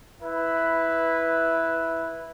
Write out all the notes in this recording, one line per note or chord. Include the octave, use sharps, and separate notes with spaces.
E4 B4